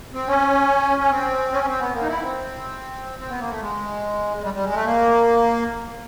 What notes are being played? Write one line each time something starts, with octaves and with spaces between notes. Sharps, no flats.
C4
C#4
C#4
C4
C#4
C4
B3
A#3
D#4
E4
C4
C4
B3
A#3
A3
G#3
G#3
G3
G3
G#3
A3
A#3